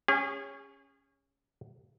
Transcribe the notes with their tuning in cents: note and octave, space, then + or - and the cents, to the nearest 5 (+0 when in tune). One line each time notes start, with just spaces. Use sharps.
C#4 +0 G#4 -35